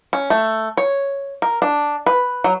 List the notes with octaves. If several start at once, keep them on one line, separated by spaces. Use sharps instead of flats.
C#4
A3
C#5
A#4
D4
B4
F#3